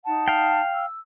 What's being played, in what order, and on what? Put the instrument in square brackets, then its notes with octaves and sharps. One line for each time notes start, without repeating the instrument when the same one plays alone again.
[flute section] D#4 F#5 A5
[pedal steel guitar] F5 G5
[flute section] E6